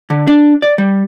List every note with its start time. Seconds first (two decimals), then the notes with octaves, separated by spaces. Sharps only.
0.10 D3
0.28 D4
0.62 D5
0.78 G3